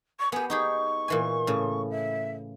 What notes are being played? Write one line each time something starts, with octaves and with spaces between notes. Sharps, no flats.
C#6
B3 G4 G#5
D#4 G4 G#4 C#6
A#2 E3 G#5
A2 C#3
E5